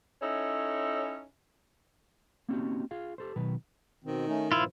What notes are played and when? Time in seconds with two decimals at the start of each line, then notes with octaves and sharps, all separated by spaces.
0.21 C#4 D#4 E4 A4 C#5
2.49 A#3 C4 C#4 D#4 F#4 G4
2.91 F4 G#4 F5
3.18 G4 A4 C5
3.36 B2 D#3 F#3 B4
4.04 B2 D#3 C4
4.27 A3 C#4 D#4
4.52 G2 A#2 F3 E4 F4